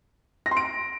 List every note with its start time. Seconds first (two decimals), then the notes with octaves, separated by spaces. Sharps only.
0.46 A#6
0.51 C6
0.57 D7